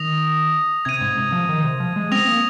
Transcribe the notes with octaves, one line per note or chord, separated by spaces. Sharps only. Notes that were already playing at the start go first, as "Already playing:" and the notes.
Already playing: D#3 D#6 A#6 F7
C3 G#6 D#7
G#2
C3
F3
D#3
C3
F3
G#3
C4 D#6 A#6 F7
A#3